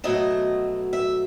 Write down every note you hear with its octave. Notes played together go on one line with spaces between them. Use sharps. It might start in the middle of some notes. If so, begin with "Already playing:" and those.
B2 F#3 A3 D#5
E5